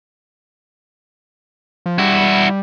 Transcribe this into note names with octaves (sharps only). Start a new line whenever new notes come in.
F3
G3 E4 F#4